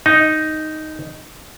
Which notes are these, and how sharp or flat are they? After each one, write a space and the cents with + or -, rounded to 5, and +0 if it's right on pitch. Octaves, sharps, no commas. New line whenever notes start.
D#4 +0